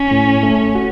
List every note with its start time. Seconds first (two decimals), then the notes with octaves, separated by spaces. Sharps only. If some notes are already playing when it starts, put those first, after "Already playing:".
Already playing: C#4
0.11 A2
0.43 A3
0.75 F#4